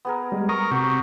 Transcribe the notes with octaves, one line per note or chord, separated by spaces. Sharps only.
B3 G#4 A#4
G3 G#3
A#4 A#5 C#6 D#6
C3 F#4